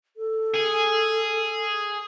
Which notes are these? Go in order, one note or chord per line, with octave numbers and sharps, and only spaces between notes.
A4
G#4